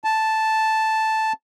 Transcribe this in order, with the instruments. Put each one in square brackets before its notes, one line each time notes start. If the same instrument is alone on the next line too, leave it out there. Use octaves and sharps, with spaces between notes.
[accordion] A5